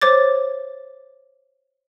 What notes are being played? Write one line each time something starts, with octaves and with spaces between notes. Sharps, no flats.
C5 C#5 D6 A6